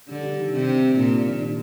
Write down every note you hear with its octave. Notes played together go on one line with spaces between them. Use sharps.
D3 G3
G3
D#3
C3 D4
D4
G3
A#2 D4
D4
D#3
D4